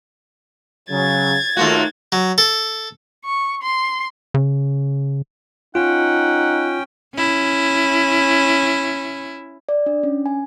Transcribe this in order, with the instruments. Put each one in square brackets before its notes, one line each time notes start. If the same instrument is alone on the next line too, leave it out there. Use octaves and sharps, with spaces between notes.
[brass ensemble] C#3 F#3 [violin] G#6 A6
[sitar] D#2 A#3 F#4 [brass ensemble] A3 F4
[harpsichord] F#3
A4
[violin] C#6
C6
[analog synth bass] C#3
[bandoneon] C#4 G5 [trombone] D#4 [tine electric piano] F4 [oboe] F#5
[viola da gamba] C#4 E4
[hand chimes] D5
D4
C#4
G#5